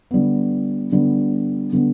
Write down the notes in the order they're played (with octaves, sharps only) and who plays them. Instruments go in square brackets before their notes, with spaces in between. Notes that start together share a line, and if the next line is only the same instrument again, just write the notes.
[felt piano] D3 G3 B3
D3 G3 B3
D3 G3 B3